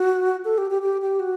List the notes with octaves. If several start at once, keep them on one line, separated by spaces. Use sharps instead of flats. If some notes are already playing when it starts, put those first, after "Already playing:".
Already playing: F#4
A4
G4
G4
G4
G4
F#4